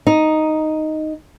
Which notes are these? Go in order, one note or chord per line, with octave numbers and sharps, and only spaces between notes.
D#4